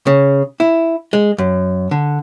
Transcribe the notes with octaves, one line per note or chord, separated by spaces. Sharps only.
C#3
E4
G#3
F#2
D3